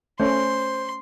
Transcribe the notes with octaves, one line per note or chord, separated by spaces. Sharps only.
A3 C#4 C5 C6